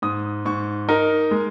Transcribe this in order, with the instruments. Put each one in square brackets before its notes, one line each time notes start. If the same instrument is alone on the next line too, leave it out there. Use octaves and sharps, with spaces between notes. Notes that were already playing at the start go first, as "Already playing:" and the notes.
[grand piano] G#2 D#6
G#2 C#6
D#4 A#4
G#3